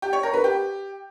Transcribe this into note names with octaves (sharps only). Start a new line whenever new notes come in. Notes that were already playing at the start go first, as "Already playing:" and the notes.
G4
C#5
A#4
B4
G4